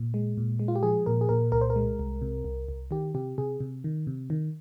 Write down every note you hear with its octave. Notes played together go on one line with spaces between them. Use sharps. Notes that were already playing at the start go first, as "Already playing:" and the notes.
Already playing: A#2
G#3
A#2
G#3
F4
G4
F3 G#4
A#2 A#4
G#4
A#2 A#4
C2 A#4
C5
A#4
G#3
C2
C3
C2
C2
D#3 G4
C3 G4
C3 G#4
C3
D#3
C3
D#3